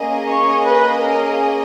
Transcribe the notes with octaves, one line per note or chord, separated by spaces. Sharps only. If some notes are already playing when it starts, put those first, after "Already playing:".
Already playing: A#3 C#4 G#4 D#5
C#5
B4
A#4